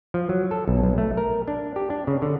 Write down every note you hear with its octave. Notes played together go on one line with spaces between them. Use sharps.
F3
F#3
A4
B1
B1
A3
A#4
D4
G4
D4
C#3
D3